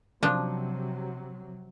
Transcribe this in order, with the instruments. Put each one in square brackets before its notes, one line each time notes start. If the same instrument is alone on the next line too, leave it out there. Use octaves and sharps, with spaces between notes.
[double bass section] C3 F#3 [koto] F3 D4